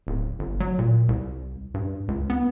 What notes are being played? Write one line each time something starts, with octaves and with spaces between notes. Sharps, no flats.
D1
G1
F#3
A#2
C2
G2
C#2
B3